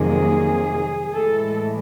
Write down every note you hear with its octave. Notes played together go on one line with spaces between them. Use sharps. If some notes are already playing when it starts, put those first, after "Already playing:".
Already playing: F2 C3 D#3 F#3 A#3 G#4
A2 E3 G#3 A4